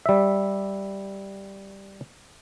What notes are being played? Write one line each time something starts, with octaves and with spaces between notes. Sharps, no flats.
G3 E5